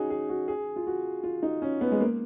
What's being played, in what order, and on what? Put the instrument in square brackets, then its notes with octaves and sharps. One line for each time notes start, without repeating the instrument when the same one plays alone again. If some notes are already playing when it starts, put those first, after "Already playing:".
Already playing: [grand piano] C#4 D#4 F#4 G#4
G#4
F#4
G#4
F4
F#4
F4
D#4
C#4
B3
G#3
A#3